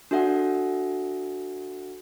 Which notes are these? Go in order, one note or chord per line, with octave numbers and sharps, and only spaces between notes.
D4 F#4 A4 E5 F#5